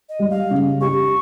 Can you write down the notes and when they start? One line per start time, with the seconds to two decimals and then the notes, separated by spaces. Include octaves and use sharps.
0.09 D#5
0.19 G3
0.30 F5
0.50 C#3
0.81 G4 C#6